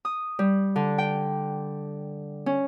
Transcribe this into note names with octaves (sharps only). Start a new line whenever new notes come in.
D#6
G3
D3
G5
C#4